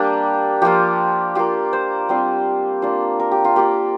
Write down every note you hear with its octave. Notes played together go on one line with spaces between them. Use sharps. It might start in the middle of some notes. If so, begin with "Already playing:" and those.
Already playing: G3 A#3 D4 G4
F3 A#3 F4 G4
A#3 F4 G4
C5
G3 C4 F4
A#3 D4 F4
A#4
G4
F4
A#3 F4 G4